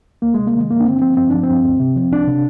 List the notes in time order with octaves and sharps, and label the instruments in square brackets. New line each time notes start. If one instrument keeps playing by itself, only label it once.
[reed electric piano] D2 A#3
C3 G#3
A#3
D#3 G#3
G2 A#3
D4
D3 C4
F3 C4
G2 C4
F3 D4
C4
G2
D2
C3
F3
C2 D4
C3